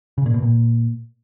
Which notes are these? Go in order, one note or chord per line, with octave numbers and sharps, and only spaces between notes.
C#3
A#2
B2
A#2